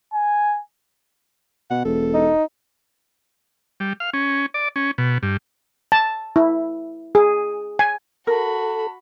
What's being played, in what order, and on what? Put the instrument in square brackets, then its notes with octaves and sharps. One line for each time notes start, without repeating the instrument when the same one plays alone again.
[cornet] G#5
[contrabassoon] B2 [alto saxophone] F#5
[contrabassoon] E1 [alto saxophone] A4
[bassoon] D#4
[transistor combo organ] G3
F5
C#4
D5
C#4
B2
G2
[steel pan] A5
E4
G#4
G#5
[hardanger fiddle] F#4 B5 [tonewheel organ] A4 [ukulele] A#4 [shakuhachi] A5